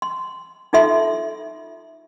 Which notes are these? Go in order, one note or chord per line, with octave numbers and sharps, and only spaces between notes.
C6
D#4 F4 A4 E5 C6